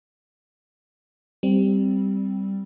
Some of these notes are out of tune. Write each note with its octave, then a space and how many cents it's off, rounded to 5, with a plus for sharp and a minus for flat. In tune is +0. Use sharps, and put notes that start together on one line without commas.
G3 +0 C4 -5